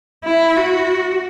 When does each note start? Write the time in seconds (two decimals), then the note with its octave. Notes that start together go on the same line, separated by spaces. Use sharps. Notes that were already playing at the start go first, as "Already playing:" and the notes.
0.25 E4
0.57 F#4